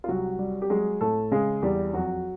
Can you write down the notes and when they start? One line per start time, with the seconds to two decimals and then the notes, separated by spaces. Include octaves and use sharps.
0.04 F4
0.08 C2 F#3 F#4
0.39 G3
0.62 G4
0.70 F#3 G#3 G#4
1.01 A2 A3 A4
1.31 C#3 G#3 G#4
1.62 E2 G3 G4
1.93 F2 F#3 F#4